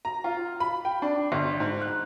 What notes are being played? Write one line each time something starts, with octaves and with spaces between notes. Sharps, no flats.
A#5
F4
B5
G5
D4
G1
G#2
F#6